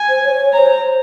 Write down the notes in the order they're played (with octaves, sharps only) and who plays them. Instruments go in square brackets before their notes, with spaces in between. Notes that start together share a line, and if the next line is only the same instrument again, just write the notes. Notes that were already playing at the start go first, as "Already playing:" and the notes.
Already playing: [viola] G#5
[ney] C5
C#5
[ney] C#5 [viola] A#5
[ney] C5